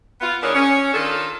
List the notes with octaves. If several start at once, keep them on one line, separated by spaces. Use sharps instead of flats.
B3 F4
E3 D4 G#4 A#4 C#5
C#4
D#3 D4 F4 A4